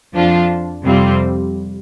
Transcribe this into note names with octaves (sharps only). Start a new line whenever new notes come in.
F2 F3 D4 F4
F2 C3 G3 C4 F4